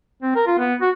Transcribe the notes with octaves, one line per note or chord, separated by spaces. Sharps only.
C4
A#4
F4
B3
F#4